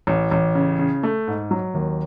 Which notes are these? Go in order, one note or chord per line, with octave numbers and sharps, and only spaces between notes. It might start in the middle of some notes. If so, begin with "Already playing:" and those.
A1
A1
C#3
C#3
A3
G#2
F#3
D#2